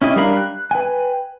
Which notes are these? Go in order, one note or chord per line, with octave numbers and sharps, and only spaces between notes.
C#4 E4 G4 D#5
G3 D4 A#4 F5 B5
F#6
B4 G5 G#5